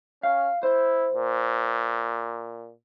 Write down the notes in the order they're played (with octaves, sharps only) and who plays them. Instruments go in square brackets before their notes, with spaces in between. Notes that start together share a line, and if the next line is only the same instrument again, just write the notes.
[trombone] C#4 [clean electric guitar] F5
[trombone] E4 [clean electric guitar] C5
[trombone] A#2